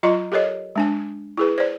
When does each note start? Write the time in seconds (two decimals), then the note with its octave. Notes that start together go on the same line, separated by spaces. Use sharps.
0.03 F#3 F4 D#5 A#5 C6
0.32 G4 A4 A#4 C#5 D#5
0.76 G#3 D4 G#5
1.37 E4 G#4 B4
1.58 C5 D5